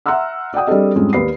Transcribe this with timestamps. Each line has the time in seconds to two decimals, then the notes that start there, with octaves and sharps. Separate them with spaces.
0.06 E5 F#5 A#5 C6 E6 F6
0.54 D5 F#5 G5 D#6
0.67 G3 C4 D4 G#4 A4 D#5
0.96 F2 G#2 G3 G#3 C#4 D4
1.13 D#2 G4 B4 D5 C7